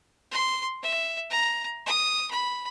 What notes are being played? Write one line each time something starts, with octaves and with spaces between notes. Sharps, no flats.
C6
E5
A#5
D#6
B5